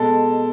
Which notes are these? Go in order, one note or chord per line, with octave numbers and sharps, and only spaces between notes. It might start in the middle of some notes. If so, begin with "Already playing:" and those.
Already playing: B2 G#3 A4 A5